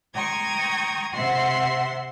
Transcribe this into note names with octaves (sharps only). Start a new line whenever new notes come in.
G5 A#5 C6 C#6 D#6 G#6
C3 C4 E5 F#5 C6